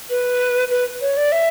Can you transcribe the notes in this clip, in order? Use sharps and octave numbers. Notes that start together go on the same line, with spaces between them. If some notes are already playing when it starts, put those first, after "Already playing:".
B4
B4
C#5
D5
E5